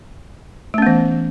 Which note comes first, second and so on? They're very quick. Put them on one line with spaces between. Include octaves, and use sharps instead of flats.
A3 C#4 B3 E3